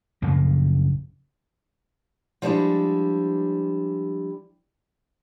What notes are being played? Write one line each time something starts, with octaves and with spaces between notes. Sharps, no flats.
A#1 F#2 C#3 A#3
F3 G3 G#3 D4 E4